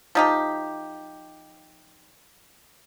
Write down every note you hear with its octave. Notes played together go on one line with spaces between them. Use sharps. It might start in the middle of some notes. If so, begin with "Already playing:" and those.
F3 D#4 G4